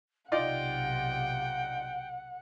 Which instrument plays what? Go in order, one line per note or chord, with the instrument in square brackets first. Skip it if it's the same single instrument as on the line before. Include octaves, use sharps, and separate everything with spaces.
[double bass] B1 C3 [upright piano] D#4 F4 D5 [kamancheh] F#5 [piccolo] G5